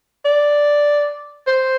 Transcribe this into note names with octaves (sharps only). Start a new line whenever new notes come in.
D5
C5